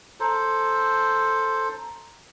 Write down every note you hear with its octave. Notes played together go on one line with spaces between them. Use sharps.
A4 C5 A#5